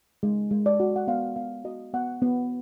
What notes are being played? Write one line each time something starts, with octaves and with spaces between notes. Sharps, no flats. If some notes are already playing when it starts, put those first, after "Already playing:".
G#3
G#3
D5
F#4
F#5
B3 F5
B3 F5
F#4 D#5
B3 F#5
B3